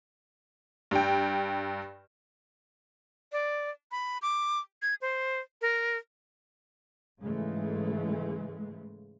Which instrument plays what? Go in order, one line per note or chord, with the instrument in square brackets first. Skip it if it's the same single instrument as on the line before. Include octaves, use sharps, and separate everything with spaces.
[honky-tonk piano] G2 G5
[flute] D5
B5
D6
G#6
C5
A#4
[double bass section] G#2 C#3 E3 G#3 A3